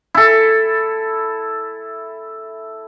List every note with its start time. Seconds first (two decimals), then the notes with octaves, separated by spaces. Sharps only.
0.15 E4 A4